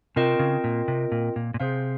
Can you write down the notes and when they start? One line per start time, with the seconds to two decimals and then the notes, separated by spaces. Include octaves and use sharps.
0.16 C3 C4 F4 A#4 D#5 G5
0.39 C#3
0.64 A#2
0.88 C3
1.12 A#2
1.36 A#2
1.54 A#2
1.60 C3 G#4 C5 F5